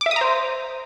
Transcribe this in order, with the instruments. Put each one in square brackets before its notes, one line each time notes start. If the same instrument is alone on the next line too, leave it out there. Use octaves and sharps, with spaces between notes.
[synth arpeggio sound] D6
E5
D#6
A#5
C5